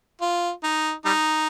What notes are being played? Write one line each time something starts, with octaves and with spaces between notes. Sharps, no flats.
F4
D#4
G3 D#4